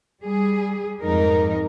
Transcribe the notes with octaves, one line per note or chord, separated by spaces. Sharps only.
G3 G#4
F2 G#2 D#4 A#4